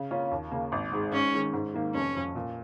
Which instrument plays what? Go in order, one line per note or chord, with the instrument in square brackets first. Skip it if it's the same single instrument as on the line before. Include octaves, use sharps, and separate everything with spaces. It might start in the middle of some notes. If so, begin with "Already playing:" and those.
Already playing: [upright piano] C#3
A#3 C#4 F4
D#2
C#3 A#3
G#1
G#2 G#3
[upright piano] G#2 [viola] C#4
[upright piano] D#3 G#3
G#2
D#3 A#3
[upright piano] F1 [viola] C#4
[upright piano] F2 F3
A#2